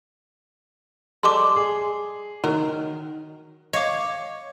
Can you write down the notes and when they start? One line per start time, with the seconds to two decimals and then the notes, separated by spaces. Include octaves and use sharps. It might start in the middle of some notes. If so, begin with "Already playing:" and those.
1.23 G3 G#3 A4 C6 D6
1.56 G#4
2.44 D#3 F#3 A#4
3.73 C#5 D#5 F5 D6